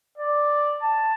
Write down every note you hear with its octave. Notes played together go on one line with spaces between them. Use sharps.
D5
A5